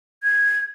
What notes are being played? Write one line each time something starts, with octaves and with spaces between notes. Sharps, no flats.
G#6